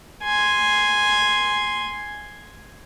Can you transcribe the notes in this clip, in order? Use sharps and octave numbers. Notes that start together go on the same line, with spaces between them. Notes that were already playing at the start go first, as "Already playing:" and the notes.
G#5 C6